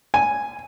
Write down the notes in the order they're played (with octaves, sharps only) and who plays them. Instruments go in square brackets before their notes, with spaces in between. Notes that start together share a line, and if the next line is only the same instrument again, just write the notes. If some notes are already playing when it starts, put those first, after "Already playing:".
[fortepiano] G#5